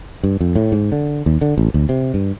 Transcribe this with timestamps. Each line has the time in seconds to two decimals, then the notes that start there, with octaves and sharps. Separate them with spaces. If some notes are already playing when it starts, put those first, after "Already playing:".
0.23 G2
0.41 F2
0.56 A2
0.72 G#2
0.92 D3
1.26 D#2
1.41 D3
1.58 A1
1.74 D2
1.89 C3
2.14 G2